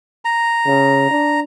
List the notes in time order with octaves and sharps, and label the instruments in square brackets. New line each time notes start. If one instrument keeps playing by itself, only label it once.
[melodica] A#5
[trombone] C#3
D4